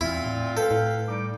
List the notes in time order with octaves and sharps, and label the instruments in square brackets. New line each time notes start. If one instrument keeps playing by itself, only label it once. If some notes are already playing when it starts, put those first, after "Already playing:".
[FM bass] E2 [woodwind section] A#2 C4 F4 [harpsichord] E4
[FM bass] A2
[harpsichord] A4 [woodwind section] B4 F5 G5
[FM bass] A2
[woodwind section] G3 D#4 D6